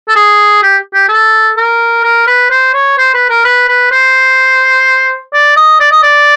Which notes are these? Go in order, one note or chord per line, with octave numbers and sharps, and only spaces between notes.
A4
G#4
G4
G4
A4
A#4
A#4
B4
C5
C#5
C5
B4
A#4
B4
B4
C5
D5
D#5
D5
D#5
D5